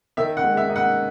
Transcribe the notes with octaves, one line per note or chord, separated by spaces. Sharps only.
D#3 E5
F#5
G#3
E5
D#4
F#5